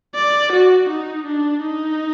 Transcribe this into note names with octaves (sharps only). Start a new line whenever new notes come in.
D5
F#4
D#4
D4
D#4